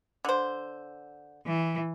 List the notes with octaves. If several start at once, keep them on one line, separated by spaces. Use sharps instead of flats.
D3 C5
E3